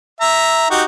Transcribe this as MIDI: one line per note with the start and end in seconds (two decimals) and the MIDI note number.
0.21 0.68 76
0.21 0.68 82
0.71 0.84 63
0.71 0.84 66
0.71 0.84 67